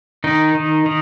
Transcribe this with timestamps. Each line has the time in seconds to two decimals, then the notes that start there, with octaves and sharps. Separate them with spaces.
0.24 D#3 D#4
0.55 D#3
0.86 D#3